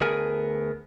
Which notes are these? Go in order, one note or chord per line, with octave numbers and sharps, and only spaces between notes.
D2 A3 B3 G#4 A#4 G#5